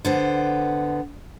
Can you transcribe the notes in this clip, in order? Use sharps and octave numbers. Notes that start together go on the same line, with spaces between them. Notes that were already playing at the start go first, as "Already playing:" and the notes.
D3 B3 C5